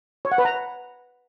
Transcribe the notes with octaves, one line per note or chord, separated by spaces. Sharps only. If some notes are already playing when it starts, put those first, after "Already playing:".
C#5
F#5
B4
A#5